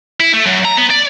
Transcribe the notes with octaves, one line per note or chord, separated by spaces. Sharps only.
E4
A3
F#2
A#5
B3
D5